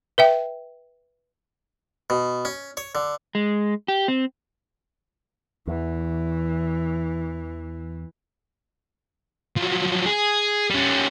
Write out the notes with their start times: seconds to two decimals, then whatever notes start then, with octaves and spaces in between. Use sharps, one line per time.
0.18 B4 E5 G5
2.10 B2
2.45 C#4
2.77 C#5
2.95 D3
3.35 G#3
3.88 G4
4.08 C4
5.67 E2 E3
9.56 F3 F#3
10.06 G#4
10.70 G3 C#4